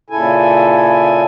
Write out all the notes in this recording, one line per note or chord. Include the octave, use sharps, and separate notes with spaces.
A#2 C#3 E4 A4 G#5